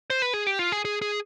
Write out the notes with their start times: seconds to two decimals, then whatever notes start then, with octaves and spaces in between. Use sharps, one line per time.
0.10 C5
0.22 B4
0.34 G#4
0.47 G4
0.59 F4
0.72 G#4
0.85 G#4
1.02 G#4